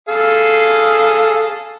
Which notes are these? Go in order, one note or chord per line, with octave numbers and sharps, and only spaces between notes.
G#4 A4 F5